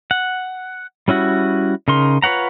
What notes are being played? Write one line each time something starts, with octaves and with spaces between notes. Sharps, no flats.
F#5
G3 C#4 E4 F#4
C#3 D#4 A#4 C6
F4 B4 C#5 F#5 A#5